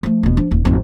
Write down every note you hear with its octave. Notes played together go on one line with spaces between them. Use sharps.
F3 A3
E1 B2
F3 D4
D#1 F2
G#1 F2